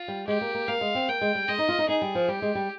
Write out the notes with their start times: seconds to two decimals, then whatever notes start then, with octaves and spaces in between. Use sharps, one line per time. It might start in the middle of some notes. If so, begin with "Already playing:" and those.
Already playing: F4
0.08 G3
0.27 G#3 G4
0.41 A#3
0.54 A#3
0.68 A#3 F5
0.81 G#3
0.95 C4
1.08 A#3 G5
1.21 G#3
1.35 G3
1.48 G#3 D#5
1.59 D#4
1.69 F4
1.78 D#4
1.89 D#4 G#4
2.02 G3
2.15 F3
2.28 G3 G4
2.42 G#3
2.55 G3